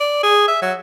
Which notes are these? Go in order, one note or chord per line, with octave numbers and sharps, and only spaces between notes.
D5
G#4
E5
F#3